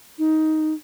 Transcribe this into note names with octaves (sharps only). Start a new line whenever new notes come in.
D#4